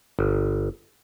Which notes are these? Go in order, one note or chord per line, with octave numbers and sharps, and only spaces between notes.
G1